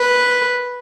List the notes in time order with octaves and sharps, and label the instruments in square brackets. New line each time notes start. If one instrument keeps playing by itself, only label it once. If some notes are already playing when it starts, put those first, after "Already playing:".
Already playing: [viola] B4